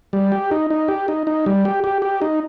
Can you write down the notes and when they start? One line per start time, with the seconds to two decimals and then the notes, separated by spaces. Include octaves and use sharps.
0.13 G3
0.32 G4
0.51 D#4
0.70 D#4
0.88 G4
1.08 D#4
1.27 D#4
1.46 G3
1.65 G4
1.84 G4
2.02 G4
2.22 D#4